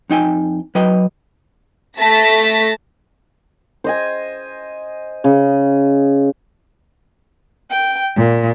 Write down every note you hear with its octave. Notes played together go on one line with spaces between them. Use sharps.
F2 D#4 G5 G#5
F#3 B4 D#5 G5
A3 A5 A#6 B6
C5 D#5 G#5
C#3
G5
A#2